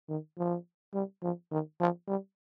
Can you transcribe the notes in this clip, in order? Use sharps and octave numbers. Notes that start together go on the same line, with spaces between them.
D#3
F3
G3
F3
D#3
F3
G3